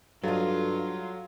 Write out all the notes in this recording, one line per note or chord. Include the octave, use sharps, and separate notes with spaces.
G2 F#3 F4 A4 D#5